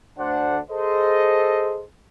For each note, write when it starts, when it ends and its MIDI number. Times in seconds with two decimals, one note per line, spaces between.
0.18 0.59 38
0.18 0.59 62
0.18 0.59 72
0.18 0.59 78
0.70 1.84 68
0.70 1.84 69
0.70 1.84 72
0.70 1.84 75